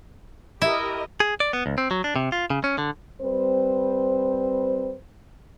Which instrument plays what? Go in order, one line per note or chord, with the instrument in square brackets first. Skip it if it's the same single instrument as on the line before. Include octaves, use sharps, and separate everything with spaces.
[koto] E4 E5 [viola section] G4 A#4 D#5
[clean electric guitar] G#4
D5
B3
C#2
C4
F#3
D4
C3
F4
C#3
C#4
D3
[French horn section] G3 C4 B4 C5